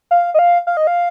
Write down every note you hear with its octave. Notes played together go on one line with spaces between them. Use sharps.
F5
D#5
F5
F5
D#5
F5